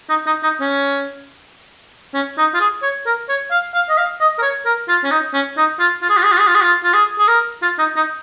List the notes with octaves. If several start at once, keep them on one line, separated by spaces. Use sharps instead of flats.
D#4
D#4
D#4
C#4
C#4
D#4
F4
G#4
C#5
A#4
C#5
F5
F5
D#5
F5
D#5
A#4
C#5
A#4
F4
C#4
D#4
C#4
D#4
F4
F4
G#4
F4
G#4
F4
G#4
F4
G#4
F4
F4
G#4
G#4
A#4
F4
D#4
D#4